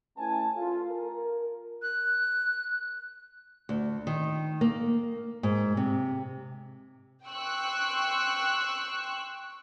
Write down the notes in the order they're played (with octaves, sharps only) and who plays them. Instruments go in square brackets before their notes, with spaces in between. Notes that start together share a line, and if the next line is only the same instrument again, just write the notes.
[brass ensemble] A3 C#4 E4 B4 G#5 A5
F4 A4
A#4
[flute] F#6
[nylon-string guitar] D2
D#3
A#3
G#2
C3
[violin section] G5 C6 C#6 E6 F#6